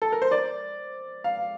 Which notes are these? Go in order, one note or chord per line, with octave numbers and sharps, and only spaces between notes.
A4
A#4
C5
D5
F5